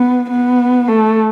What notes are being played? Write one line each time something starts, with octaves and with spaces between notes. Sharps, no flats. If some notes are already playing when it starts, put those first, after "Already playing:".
Already playing: B3
B3
A3